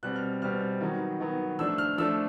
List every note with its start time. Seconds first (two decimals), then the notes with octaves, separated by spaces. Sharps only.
0.03 B2 G3 C4 F#6
0.16 F6
0.42 B2 G3 C4 F6
0.81 D#3 F#3 B3
1.20 D#3 F#3 B3
1.59 F3 A3 D4 E6
1.78 F6
1.98 F3 A3 D4 E6